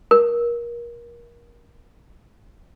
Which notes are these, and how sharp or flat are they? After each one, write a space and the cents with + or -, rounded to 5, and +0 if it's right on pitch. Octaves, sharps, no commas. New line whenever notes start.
A#4 +25